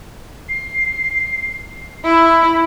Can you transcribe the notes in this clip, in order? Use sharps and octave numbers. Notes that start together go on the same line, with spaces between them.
C7
E4 B5